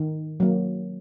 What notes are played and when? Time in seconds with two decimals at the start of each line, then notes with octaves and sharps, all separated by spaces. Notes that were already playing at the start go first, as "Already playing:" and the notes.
Already playing: D#3
0.40 F#3 A#3